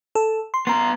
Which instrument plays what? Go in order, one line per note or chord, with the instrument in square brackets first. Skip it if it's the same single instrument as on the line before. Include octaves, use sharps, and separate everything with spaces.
[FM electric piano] A4
C6
[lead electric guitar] B3 A#5 [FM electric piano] C6